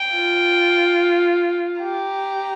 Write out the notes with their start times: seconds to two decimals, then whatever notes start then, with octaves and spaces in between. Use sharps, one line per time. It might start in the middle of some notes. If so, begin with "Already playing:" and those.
Already playing: G5
0.16 F4
1.82 G4 A#5